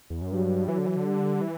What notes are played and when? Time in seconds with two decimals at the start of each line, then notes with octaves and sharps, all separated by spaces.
0.10 E2
0.22 F#2
0.32 G2 F#3
0.68 E3 F#3
0.78 D3
0.86 E3
0.96 D3
1.06 G3
1.41 E3